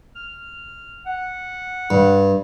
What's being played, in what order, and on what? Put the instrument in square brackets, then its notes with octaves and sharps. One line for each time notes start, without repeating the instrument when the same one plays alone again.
[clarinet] F6
F#5
[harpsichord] G2